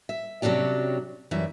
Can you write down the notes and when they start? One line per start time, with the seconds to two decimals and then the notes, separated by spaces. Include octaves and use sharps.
0.09 E5
0.42 C3 F#3 C#4 D4 G4
1.31 F#2 E3 G3 E5